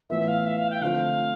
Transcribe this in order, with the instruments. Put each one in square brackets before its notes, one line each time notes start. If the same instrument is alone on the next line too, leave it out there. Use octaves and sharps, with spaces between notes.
[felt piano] A2 E3 B3 F4 [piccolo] E5
[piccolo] F5
E5
F5
G5
[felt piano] D3 F3 A3 C4 F4 [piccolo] F5